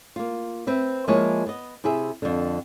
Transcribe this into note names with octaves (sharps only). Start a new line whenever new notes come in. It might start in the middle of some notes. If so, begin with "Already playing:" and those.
A#3 F4
C4 B4 E5
F3 G#3 A#3 E4 G#4 C#5
B3 D#5
C3 E4 G#4 E5
F2 D3